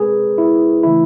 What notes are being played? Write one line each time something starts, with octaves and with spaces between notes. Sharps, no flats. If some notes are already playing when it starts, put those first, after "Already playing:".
Already playing: B2 G#3 C4 G#4 A#4 B4
E4
C#3 E3 A3 E4